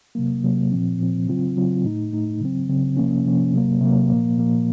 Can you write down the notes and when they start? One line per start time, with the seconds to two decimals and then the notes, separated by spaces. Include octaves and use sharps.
0.15 C3 F#3 A#3
0.44 C3 F#3 A#3
0.72 A#2 F3 C4
1.00 A#2 F3 C4
1.28 C#3 F#3 C4 F4
1.56 C#3 F#3 C4 F4
1.84 A2 A3 D#4
2.13 A2 A3 D#4
2.41 C#3 F#3 C4
2.69 C#3 F#3 C4
2.97 C3 F3 A#3 C#4
3.25 C3 F3 A#3 C#4
3.53 C3 F#3 A#3
3.81 C3 F#3 A#3
4.09 A#2 F3 A#3
4.38 A#2 F3 A#3